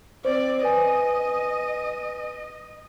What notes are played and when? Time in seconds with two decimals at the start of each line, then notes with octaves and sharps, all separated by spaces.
0.25 C4 C5 D5
0.63 B4 D#5 G#5